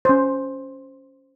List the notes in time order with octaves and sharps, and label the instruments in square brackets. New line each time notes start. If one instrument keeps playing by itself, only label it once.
[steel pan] C#4 C5